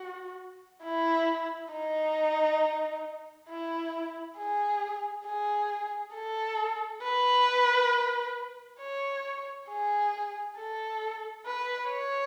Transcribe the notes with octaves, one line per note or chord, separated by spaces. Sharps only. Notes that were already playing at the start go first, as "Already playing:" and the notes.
Already playing: F#4
E4
D#4
E4
G#4
G#4
A4
B4
C#5
G#4
A4
B4
C#5